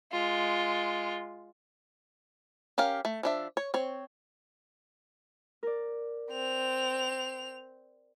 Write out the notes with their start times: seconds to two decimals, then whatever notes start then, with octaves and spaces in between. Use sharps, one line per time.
0.12 G#3 F4
2.78 C#4 G4 A#4 F5
3.05 A3
3.23 F3 D4 E5
3.57 C#5
3.74 C4 C#5
5.63 A#4 D5
6.31 C4 F7